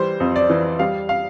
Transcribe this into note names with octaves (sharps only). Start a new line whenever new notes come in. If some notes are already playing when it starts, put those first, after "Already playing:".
Already playing: E3 G3 C5
F2
D5
E3
G3 F5
F5